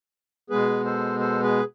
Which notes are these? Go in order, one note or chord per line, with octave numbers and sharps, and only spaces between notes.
B2 G#3 B3 G#4 B4
A4 C5
A4 C5
G#4 B4